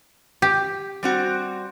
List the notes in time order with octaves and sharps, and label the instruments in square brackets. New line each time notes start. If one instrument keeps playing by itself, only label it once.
[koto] G4
[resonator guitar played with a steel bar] G3 C4 F#4